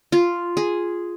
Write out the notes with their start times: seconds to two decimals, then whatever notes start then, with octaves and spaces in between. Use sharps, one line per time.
0.12 F4
0.57 G#4